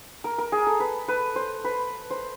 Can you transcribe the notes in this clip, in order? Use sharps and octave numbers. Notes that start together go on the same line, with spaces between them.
A#4
A#4
G#4
A4
B4
B4
C5
B4
C5